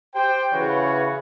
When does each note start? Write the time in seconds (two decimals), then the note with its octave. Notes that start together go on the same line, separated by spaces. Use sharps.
0.15 G4 C5 G5
0.52 C#3 E3 C#4 F#4 B4 C#5